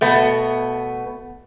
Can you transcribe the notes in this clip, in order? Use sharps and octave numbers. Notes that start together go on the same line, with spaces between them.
B2 A3 B3